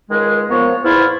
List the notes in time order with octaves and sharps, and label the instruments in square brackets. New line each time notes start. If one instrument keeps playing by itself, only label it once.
[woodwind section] C#2 D#3 G#3
F3 A#3 B3 C#5
E2 G#2 E4 F4